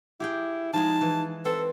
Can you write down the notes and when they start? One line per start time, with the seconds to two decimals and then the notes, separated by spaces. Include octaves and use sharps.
0.20 E4 G4 G#4 G5
0.73 F3 G#3 D#4 G#4 A5
1.01 E3
1.45 C4 A4 B4